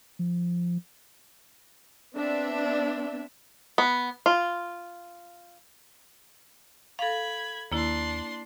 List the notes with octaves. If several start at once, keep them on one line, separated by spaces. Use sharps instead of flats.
F3
B3 C4 D4 E5
B3
F4
A4 F5 B5 G#6
D#2 A#3 D4 E4 C6